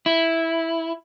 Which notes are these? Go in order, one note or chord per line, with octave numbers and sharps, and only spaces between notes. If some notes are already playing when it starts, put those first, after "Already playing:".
E4